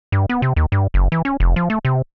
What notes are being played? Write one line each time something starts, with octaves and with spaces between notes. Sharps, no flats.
G2
B3
C3
D#2
G2
F#1
E3
C#4
F1
F3
A3
C3